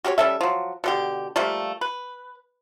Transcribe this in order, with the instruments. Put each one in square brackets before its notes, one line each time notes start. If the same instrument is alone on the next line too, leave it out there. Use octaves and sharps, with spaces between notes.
[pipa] F#4 G4 A4 C#5
G3 C#4 A4 E5
F3 F#3
B2 D3 G4
F3 G3 A3 A#3
B4